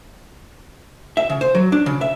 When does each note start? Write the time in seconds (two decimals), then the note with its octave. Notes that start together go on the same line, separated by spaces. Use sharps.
1.17 E5
1.30 C#3
1.41 C5
1.55 F#3
1.72 D4
1.86 C#3
2.01 E5